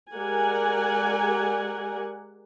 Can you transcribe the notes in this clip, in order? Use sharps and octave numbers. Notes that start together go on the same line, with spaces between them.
G#3 G4 A#4 D5 F#5 G#5